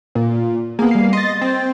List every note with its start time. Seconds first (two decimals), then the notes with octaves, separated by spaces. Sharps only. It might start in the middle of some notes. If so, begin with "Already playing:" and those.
0.15 A#2
0.79 A#3 B3 G#4
0.91 G3 C7
1.13 D#5 C6 A6
1.41 C4